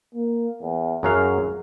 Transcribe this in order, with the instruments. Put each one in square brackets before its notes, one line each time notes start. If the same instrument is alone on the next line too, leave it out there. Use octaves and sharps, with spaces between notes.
[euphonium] A#3
E2
[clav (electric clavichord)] F#2 F#3 F5 [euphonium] G#4